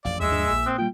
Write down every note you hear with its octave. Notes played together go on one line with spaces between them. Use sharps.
A1 F2 D5 F5
D#2 G#3 E5 E6
G2 F3 D4
A#1 A#2 G#5
C4 D#6 F#6
G3 A#3 F4 G5